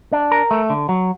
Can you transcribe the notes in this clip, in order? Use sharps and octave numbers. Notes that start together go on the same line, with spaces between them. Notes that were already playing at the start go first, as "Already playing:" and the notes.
D4
A#4
A3
D3
F#3